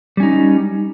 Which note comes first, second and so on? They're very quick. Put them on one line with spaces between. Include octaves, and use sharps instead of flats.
G3 C#4 D#4